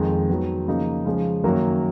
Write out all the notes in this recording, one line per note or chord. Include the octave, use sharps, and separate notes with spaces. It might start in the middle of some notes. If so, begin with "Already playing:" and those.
Already playing: F2 D#3 G#3
D#3 F#3 B3
C#3 F3 A#3 D#4
C#3 F3 G#3
F#2 D#3 F#3 A#3